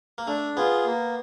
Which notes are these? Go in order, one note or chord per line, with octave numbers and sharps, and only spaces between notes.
A#3
A3 D4
B3 F4 G#4
A#3